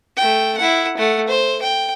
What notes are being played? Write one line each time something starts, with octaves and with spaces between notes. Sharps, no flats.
A3 G5
E4 F#5
A3 F#5
C5
G5